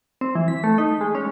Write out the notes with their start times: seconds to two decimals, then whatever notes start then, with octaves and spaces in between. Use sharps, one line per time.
0.21 C4
0.35 E3
0.48 B6
0.64 A3
0.78 D#4
1.01 G#3
1.15 C#4